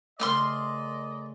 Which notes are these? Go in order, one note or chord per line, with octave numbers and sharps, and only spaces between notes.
C#3 A3 A#4 D5 D#5 C6 E6 F6